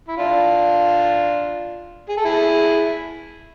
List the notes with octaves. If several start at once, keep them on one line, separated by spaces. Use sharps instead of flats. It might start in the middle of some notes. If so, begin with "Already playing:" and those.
E4
D4 F4
G#4
A4
E4 G#4